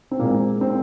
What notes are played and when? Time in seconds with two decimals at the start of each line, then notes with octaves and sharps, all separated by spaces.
0.11 C4
0.19 A#2 G#3 A#3
0.61 C4